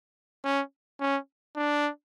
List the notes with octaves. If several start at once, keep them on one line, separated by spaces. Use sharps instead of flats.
C#4
C#4
D4